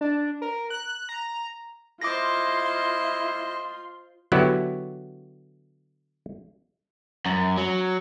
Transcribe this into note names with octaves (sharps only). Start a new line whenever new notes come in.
D4
A#4
F#6
A#5
E4 F4 C5 D#5 C6 D6 A#6
D3 F#3 B3 E4 F#4 G4
F#2
F#3